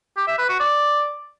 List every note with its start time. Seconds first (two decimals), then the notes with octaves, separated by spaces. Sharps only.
0.17 G4
0.28 E5
0.38 B4
0.49 F#4
0.60 D5